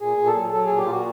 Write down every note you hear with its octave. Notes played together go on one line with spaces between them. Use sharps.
A#2 G#4
A#2
A4
F#3
F#3 A4
A#2 G#4
G4
A#2 F4 F#4